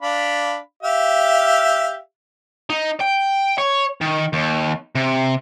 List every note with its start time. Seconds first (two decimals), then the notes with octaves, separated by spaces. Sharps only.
0.02 D4 F5 B5
0.83 G4 E5 F5
2.70 D#4
3.01 G5
3.58 C#5
4.01 D#3
4.33 D#2
4.95 C3